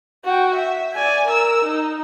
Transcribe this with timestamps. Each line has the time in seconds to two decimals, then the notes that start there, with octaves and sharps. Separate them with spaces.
0.25 F#4 G5
0.55 E5
0.94 D5 G#5
1.27 A#4 E6
1.64 D#4